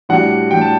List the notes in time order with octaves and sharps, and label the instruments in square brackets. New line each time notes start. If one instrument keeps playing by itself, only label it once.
[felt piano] A2 G3 D4 F#4 [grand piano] F#5
[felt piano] A2 G3 D4 F#4 [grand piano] G5
[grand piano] A5